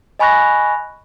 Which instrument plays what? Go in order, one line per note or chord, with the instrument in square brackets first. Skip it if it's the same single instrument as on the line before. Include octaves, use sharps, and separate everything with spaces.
[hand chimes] D#5 G#5 B5 C#6 F#6 A#6